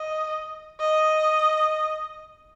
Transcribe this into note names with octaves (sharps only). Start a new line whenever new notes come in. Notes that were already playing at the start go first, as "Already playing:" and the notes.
Already playing: D#5
D#5